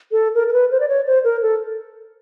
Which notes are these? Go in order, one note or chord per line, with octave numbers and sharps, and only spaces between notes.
A4
A#4
A#4
B4
C5
D5
C#5
C5
A#4
A4